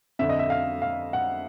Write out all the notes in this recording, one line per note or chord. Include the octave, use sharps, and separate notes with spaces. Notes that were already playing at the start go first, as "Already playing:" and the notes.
F2 D3 E5
D#5
E5
F5
F5
F#5